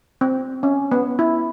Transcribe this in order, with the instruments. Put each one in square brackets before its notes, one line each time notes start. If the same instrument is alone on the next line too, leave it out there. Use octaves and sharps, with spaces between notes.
[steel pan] C4
C#4
B3
E4